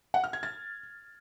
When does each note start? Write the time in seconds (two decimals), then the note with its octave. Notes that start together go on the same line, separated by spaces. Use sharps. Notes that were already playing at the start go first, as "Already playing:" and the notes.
0.14 F#5
0.24 F6
0.33 G#6
0.43 A6